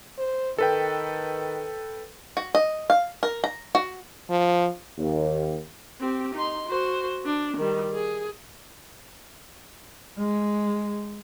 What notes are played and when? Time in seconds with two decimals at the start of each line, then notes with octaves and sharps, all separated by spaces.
0.19 C5
0.58 D#3 A4 B4 G5
2.37 F#4
2.55 D#5
2.90 F5
3.23 A#4
3.44 A#5
3.75 F#4
4.30 F3
4.98 D#2
6.00 C4 G4
6.35 D#4 C6
6.68 F#4 C5
7.26 D4
7.57 D#3 G3
7.94 G#4
10.18 G#3